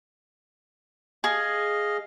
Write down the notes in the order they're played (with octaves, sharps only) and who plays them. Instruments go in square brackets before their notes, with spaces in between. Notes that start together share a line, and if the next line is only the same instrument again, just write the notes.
[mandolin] G#4 [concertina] D#5 F5